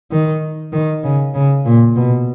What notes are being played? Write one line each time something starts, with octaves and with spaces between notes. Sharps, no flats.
D#3
D#3
C#3
C#3
A#2
B2